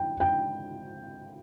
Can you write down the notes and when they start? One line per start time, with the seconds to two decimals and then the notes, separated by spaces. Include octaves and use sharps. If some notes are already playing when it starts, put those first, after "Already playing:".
Already playing: G5
0.20 G5